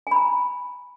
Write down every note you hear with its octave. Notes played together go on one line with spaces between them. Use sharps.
G#5 A#5 B5